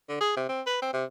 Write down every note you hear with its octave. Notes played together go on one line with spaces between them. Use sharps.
D3
G#4
C3
C4
B4
C4
C3